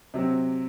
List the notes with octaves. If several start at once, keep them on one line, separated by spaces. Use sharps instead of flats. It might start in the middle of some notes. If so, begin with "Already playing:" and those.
C3 F#3 C4